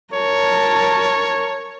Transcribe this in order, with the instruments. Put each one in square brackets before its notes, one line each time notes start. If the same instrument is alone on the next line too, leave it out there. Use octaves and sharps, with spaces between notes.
[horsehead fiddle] A#4 A5 [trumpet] C#5